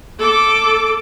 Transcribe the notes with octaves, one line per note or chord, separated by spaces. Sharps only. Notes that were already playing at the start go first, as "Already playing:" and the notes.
A4 D6